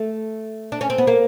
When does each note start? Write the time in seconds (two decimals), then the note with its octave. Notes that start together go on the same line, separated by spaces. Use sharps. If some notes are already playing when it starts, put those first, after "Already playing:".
Already playing: A3
0.72 D4
0.81 C#4
0.90 C4
0.98 B3
1.07 A#3